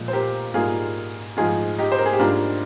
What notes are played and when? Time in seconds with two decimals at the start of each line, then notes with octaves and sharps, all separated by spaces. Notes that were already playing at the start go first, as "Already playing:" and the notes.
Already playing: A#2 F3 G#3
0.08 C5
0.13 G4 A#4
0.54 G#2 G3 A#3 F4 G#4
1.37 G#2 F3 G#3 F4 G#4
1.79 D#4 G4
1.92 C5
1.99 A#4
2.06 G#4
2.13 G4
2.19 G#2 G3 A#3 D4 F4